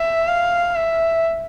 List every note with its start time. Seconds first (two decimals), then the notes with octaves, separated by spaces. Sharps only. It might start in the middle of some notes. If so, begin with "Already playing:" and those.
Already playing: E5
0.28 F5
0.76 E5